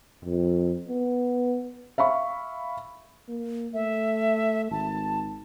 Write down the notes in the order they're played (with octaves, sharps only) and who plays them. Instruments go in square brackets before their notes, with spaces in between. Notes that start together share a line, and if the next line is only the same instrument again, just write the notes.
[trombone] F2
B3
[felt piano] E5 F5 B5 C#6
[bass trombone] A#3
[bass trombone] A3 [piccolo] E5
[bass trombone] G#1 [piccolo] A5